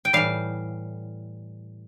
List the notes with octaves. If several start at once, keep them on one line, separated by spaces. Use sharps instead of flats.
G5
A2 E3 G3 F5